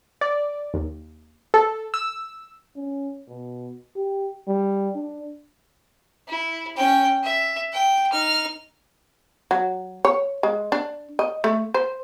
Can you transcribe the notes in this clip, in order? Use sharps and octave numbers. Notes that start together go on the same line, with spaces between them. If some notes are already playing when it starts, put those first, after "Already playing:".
D5
D#2
A4
E6
C#4
B2
G4
G3
D4
E4
C#4 G5
E5
G5
D#4 F6
F#3
C#5
G#3
D4
D#5
A3
C5